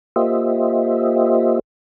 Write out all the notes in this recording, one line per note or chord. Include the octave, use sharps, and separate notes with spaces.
A#3 F4 G4 C5 D#5 E5